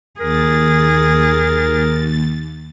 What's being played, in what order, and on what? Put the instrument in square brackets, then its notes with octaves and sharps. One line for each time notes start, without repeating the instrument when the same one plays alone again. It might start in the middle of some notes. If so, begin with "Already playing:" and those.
[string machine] D#2 A6 [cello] G#4 [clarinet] A#4